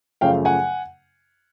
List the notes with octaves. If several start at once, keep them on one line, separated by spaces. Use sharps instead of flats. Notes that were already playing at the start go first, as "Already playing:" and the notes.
F#2 C#3 F3 A3 C#4 F5 G5
F#5 G#5